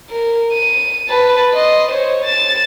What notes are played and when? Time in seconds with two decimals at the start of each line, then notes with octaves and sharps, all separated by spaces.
0.10 A#4
0.53 D#7
1.08 B4 A5
1.54 D#5 C6
1.91 C5 C#5
2.24 A6 E7